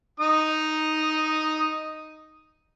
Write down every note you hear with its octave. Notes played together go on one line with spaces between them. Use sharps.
D#4 D#6